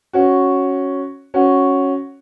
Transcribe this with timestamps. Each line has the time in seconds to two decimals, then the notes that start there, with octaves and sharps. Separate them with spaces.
0.13 C#4 F#4
1.34 C#4 F#4